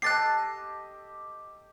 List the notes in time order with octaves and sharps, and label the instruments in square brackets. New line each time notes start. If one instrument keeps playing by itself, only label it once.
[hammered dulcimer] G4 A4 D#5 [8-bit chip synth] F#6 A6 C7